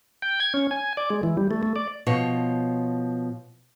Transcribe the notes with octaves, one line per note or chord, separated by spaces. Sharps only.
G5
G#6
C#4
G#5
D5
G#3
E3
G3
A3
A3
D5
B2 F3 C#5